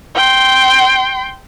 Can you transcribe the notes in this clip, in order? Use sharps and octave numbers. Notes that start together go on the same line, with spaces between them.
G5 C6